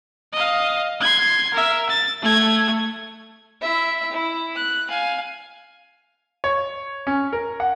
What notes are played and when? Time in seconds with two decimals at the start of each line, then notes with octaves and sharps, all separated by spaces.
0.33 D#5 F5
1.01 C6 G#6
1.54 A#4 E5
1.89 A6
2.22 A3 G#6
3.62 E4 E5
4.12 E4
4.56 F#6
4.90 F5 G#5
6.44 C#5
7.07 C#4
7.33 A#4
7.60 F#5